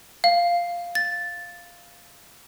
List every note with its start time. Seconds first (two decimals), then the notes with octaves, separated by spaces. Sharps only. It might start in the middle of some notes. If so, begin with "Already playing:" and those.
0.24 F5
0.95 A6